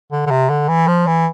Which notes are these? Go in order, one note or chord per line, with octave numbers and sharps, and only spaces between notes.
D3
D3
C3
D3
E3
F3
E3